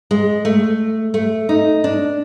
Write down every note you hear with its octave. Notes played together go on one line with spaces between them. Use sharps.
G#3
A3
A3
D#4
D4